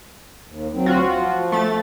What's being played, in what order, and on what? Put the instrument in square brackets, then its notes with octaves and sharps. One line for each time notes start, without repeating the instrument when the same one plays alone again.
[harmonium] D#2
D2 F#3 C4
[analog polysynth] F4 F#4
[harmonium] F3
[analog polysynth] A3 A6